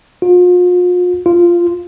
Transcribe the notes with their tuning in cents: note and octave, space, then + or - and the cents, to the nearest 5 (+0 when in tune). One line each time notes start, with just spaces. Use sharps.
F4 +40
F4 -10